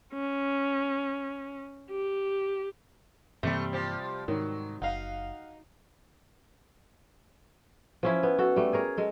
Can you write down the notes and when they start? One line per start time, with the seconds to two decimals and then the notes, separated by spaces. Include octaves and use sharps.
0.13 C#4
1.90 G4
3.43 G2 C3 E3 G3 A3 A#3
3.73 F3 G4
4.28 G#2 D#3 F#3
4.82 F#1 D#4 F5 F#5
8.03 F3 C#4 E4
8.23 B3
8.38 F#4 A4
8.56 G3 A3
8.73 G#4 A#4 C#5
8.97 G#3 A4